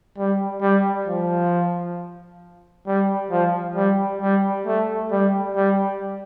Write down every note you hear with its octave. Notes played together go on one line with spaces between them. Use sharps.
G3
G3
F3
G3
F3
G3
G3
A3
G3
G3